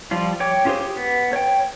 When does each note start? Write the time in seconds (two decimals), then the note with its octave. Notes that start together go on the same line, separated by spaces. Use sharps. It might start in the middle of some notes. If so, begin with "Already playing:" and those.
0.11 F3 G3 F4
0.40 C#5 G5 D6
0.65 C#4 F4 G4 G#4 C5
0.80 G4
0.97 B3
1.33 C#5 G5